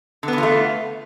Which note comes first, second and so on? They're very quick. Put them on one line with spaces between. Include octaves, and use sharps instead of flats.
D3 B3 E3 F4 A3